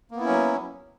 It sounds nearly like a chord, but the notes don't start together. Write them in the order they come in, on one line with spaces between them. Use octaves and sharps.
A#3 B3 E4 C#4 F#3